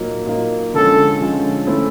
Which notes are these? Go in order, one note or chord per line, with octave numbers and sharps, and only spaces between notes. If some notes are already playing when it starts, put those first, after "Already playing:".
Already playing: A#2 F#3 A#3 D#4
A#2 F#3 A#3 D#4
D3 F3 G#3 C#4 A4
D3 F3 G#3 C#4
A3 C#4 E4 A4 C5